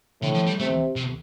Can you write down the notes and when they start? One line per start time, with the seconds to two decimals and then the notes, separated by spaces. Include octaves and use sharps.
0.22 A2 D3
0.34 F3
0.47 G3
0.59 C3 A3
0.96 C3